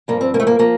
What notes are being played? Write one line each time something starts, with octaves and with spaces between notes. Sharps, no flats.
G2 F3 A#3
C4
A#3
A3
A#3
F3 A#3